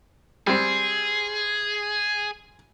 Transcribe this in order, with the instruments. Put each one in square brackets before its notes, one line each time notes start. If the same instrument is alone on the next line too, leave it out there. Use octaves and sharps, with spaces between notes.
[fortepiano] G3 C4 [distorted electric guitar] G#4